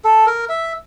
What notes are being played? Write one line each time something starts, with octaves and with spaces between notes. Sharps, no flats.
A4
A#4
E5